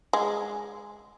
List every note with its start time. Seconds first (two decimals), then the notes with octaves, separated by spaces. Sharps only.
0.13 G#3